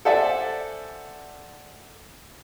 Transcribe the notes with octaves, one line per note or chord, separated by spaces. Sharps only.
A4 C5 D5 E5 F#5 G#5